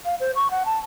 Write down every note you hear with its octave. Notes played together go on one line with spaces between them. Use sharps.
F5
C5
C#6
F#5
A5